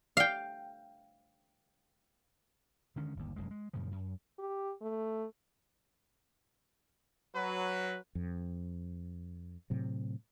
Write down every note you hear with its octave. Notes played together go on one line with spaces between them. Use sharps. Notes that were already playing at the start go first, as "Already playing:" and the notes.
F5 G5
D3 D#3 G#3 C#4
G1 D#2
F1 F#2 G#3
G#3
F#2 A#2 C#3 F3
F#2
G4
A3
F#3 B4
F2
A2 C3 F#3